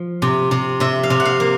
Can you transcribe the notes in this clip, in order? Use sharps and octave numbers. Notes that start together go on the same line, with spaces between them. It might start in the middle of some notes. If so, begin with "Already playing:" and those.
Already playing: F3
C3
C3
C3 E5
F5
C3
F#5
F5
A#3